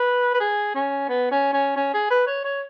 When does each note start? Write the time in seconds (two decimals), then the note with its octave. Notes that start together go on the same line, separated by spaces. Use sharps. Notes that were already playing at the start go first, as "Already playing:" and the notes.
Already playing: B4
0.34 B4
0.40 G#4
0.75 C#4
1.09 B3
1.31 C#4
1.53 C#4
1.76 C#4
1.94 G#4
2.10 B4
2.27 C#5
2.44 C#5